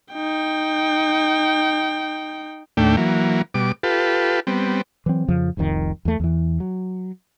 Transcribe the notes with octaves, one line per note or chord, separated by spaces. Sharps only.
D#4 G5
D#2 A2 A3 D4 G5
E3 F#3 A#3
B2 G3 D6
F4 G4 A4 B4
G3 B3 C4
E3 F#3 C4
F2 C#3 F3
F1 C2 F2 D#3
E2 A3
E2 E3
F#3